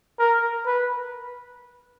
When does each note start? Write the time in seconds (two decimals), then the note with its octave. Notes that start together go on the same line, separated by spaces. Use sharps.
0.19 A#4
0.66 B4